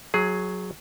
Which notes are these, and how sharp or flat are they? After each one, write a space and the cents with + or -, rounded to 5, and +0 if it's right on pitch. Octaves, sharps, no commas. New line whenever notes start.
F#3 -5 G#4 +10